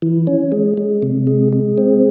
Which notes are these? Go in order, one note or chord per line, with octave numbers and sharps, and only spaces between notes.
E3
C#4
G#3
G#3
C3
G#3
G#3
C4